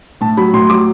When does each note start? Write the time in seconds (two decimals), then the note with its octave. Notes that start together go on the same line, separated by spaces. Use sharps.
0.21 A2 A5
0.37 F#3 B5
0.53 A2 C6
0.70 F#3 D6